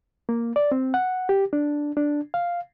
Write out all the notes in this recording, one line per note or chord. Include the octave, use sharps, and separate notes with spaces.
A#3
D5
C4
F#5
G4
D4
D4
F5